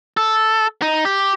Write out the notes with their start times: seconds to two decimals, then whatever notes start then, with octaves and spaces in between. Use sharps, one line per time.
0.17 A4
0.82 D#4
1.05 G4